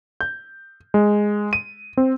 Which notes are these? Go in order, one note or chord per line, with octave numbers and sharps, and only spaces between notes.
G6
G#3
D#7
C4